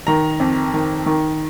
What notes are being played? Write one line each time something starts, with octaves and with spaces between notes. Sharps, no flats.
D#3 A#5
F2
D#3
D#3